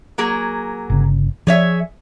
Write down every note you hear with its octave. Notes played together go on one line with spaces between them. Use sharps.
F#3 A#3 G#4
G1 C#3
F3 G#4 C#5 E5